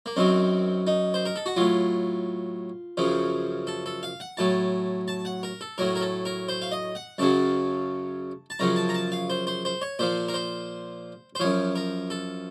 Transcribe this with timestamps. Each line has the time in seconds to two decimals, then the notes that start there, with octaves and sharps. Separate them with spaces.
0.06 A#3
0.16 F#2 D#3 F#3 C4
0.87 D#4
1.14 C5
1.26 A#4
1.36 A4
1.46 F#4
1.56 A2 F#3 F4
2.97 F#2 C#3 F3
3.67 A4
3.86 A4
4.03 F5
4.20 F#5
4.37 A2 F#3 A5
5.08 A5
5.25 F#5
5.43 A#4
5.61 A4
5.78 A2 F#3 A#4
5.96 A#4
6.01 A4
6.25 A#4
6.48 C5
6.62 F5
6.72 D#5
6.95 F#5
7.18 F#2 C#3 F#3 A5
8.50 A5
8.59 F#2 C#3 F3 A#5
8.76 A5
8.89 A#5
8.94 A5
9.12 F5
9.30 C5
9.47 C5
9.65 C5
9.82 C#5
9.99 A#2 F3 C5
10.28 A#4
10.34 C5
11.35 C5
11.40 F#2 F3 C#5
11.76 A#4
12.10 A4